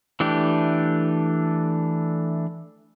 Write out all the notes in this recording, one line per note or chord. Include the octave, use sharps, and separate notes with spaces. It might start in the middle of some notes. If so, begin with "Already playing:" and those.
E3 A3 D4 G4